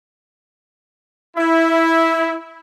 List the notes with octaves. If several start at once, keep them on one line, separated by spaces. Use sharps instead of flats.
E4